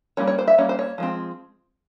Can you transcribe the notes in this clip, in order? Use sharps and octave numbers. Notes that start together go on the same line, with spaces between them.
G3 A#3 C#4 C#5
C#5
C5
E5
G3 A#3 C#4 C#5
C5
C#5
F3 G#3 C4